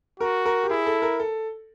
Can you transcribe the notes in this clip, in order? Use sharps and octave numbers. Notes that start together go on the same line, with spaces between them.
F#4 A#4
A#4
G4
E4 G#4
A4
A#4
A4